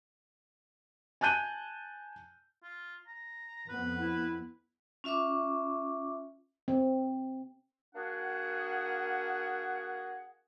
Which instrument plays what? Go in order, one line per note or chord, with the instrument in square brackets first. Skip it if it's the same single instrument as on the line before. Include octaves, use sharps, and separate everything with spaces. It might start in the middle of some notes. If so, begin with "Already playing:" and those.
[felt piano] G#5 A5 F#6 G6 D#7
[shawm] F4
A#5
[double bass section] F2 B3 [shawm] B4
[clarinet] E4
[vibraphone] C#4 F4 E5 C#6 D6
[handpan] C4
[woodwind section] A#3 D4 F#4 G#4 F#5